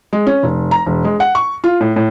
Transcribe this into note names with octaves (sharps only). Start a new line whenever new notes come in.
G#3
C#4
F1
A#5
E1
G#3
F#5
C#6
F4
A2
A2